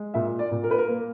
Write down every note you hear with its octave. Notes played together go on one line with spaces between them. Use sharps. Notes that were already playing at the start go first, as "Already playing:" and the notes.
Already playing: G#3
A#2 E5
D5
A#2
A#4
B4
A#4
A#3